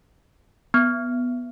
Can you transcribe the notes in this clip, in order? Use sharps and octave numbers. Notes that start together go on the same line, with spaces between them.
B3